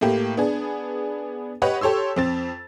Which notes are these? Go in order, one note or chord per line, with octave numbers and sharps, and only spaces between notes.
A2 A3 A#3 G4
B3 D4 G#4
G4 B4 C#5 D#5 F#5
G4 A4 C#5 C6 E6
F2 C4 A6